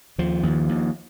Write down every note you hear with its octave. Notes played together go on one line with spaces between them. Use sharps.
D#2 F3
D#2
D#2